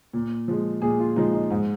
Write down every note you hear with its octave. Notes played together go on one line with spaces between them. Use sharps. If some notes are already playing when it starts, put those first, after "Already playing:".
A#2
F3 G#3
A#2 G#4
F4
F3 G#3 D#4
D#4
G#2